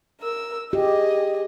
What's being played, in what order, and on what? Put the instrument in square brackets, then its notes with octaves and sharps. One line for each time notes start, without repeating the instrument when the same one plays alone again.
[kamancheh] A#4 E6
[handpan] G4 [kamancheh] G#4 D#5